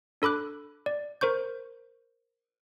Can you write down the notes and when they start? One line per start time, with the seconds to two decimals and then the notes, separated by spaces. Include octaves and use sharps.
0.22 D4 A4 B5 D6 F#6
0.86 D5
1.21 A#4 C5 C#6 G6